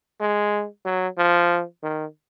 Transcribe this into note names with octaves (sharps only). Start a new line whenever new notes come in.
G#3
F#3
F3
D#3